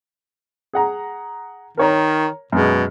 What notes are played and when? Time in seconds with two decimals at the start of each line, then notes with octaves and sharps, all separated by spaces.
0.73 G#4 F#5 A#5
1.77 D#3 A#4 C#5 A#5
2.52 F#2 B2 G#3